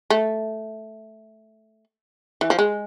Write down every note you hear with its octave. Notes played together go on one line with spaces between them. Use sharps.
A3
E3
F3
G#3